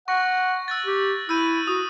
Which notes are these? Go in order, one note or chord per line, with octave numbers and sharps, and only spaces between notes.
F#5 C#6 A#6
E6 F#6 A6
G4
E4 E6 G6 D#7
F#4 D#6